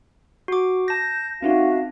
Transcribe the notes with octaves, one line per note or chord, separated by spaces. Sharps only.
F#4 D6
A5 G6 A#6
C4 C#4 D#4 F#4 E5 F5